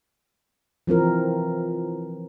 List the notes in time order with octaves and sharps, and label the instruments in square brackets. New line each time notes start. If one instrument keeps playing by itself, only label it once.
[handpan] E3 F3 C4 A#4